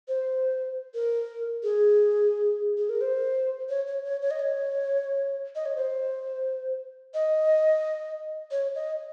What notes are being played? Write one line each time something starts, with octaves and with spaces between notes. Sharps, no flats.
C5
A#4
G#4
G#4
A#4
C5
C#5
C#5
C#5
C#5
D#5
C#5
D#5
C#5
C5
D#5
C#5
D#5